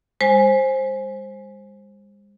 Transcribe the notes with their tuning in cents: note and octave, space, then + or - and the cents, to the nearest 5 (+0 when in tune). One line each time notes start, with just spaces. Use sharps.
G#3 -45 C5 +15 G#5 +0